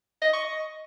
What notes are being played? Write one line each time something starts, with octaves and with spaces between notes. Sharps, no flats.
D#5
C#6
D#5